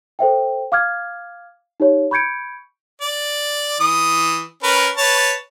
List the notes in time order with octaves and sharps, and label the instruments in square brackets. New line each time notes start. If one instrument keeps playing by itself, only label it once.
[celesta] A4 C5 E5 G5
F5 D6 F6 G#6
D#4 G4 C#5
B5 C#6 G6 G#6 C#7 D7
[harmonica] D5
E3 D#6
C#4 A#4 B4
B4 C#5 A5